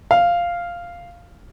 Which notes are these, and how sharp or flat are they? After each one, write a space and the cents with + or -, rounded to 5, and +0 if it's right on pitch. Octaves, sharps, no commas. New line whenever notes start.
F5 -5